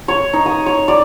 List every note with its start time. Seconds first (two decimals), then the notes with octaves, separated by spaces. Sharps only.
0.08 C#5
0.33 D#4
0.46 D#6
0.66 C#5
0.88 D5